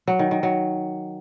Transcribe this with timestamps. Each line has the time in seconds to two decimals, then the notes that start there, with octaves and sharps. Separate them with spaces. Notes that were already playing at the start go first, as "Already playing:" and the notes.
0.08 F#3
0.19 D#3
0.31 D#3
0.43 F#3